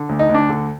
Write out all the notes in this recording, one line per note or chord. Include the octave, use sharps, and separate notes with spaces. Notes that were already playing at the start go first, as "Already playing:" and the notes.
Already playing: D3
D2
D#4
D2
D4
D3